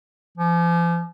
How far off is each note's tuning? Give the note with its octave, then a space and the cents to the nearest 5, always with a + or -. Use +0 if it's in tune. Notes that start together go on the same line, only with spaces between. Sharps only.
F3 -40